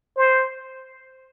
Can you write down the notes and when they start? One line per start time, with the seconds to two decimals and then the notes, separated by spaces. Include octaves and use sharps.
0.17 C5